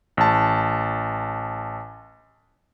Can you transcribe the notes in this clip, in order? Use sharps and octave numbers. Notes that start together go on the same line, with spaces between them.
A1 A5